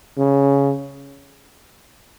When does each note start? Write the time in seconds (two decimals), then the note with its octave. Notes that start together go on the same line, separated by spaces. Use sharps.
0.18 C#3